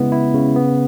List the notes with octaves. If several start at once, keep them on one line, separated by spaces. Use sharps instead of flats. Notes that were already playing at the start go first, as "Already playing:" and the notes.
Already playing: C#3 G#3 B3 E4
E4
C#3
B3